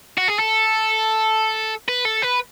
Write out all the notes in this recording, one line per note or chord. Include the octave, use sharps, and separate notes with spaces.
F#4
G#4
A4
B4
A4
B4